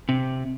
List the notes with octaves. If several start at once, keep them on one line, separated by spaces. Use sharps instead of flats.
C3